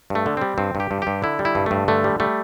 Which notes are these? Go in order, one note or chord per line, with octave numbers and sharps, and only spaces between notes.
G2 A3
D3
G3 C4
G2 C4
G2
G4
G2
G2 G4
D3 E4
G3
E4
G2
G2 A3
D3 A3
G3
G3 A3